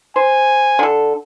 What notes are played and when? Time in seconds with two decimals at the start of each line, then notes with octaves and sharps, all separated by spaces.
0.16 C5 G#5
0.79 D3 A4